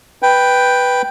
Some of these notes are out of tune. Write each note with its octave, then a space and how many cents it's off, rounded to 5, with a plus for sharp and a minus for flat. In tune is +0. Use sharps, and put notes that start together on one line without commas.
B4 +0 G5 +0